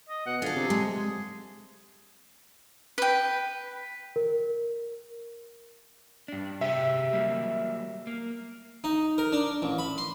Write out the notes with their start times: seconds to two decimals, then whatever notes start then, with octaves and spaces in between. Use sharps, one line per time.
0.09 D#5
0.26 B2 F#5
0.42 D3 F4 G#4 A4
0.56 C3
0.70 G#3
2.98 B4 G5
4.16 A#4
6.28 G2 D4
6.61 C3 G4 G#4 E5
7.13 F#3 G3 A#3
8.07 A#3
8.84 D#4
9.18 A#4
9.32 D4
9.62 A1
9.78 B5
9.98 C6